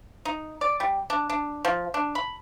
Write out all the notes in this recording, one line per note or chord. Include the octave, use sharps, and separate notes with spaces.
D#4
D5
G3
D4
D4
F3
D4
B5